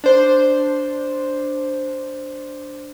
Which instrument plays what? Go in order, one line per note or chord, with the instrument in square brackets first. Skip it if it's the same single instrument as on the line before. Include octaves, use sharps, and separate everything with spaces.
[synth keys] D4 C5